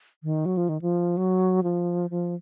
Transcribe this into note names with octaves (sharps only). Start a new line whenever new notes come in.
D#3
F#3
F3
D#3
F3
F#3
F3
F3